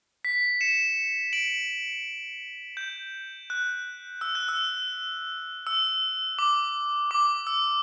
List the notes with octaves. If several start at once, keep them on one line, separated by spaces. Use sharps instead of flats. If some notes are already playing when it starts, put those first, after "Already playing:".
B6
C#7 E7
D7 F#7
G6
F#6
E6
F#6
E6
E6
D6
D6
E6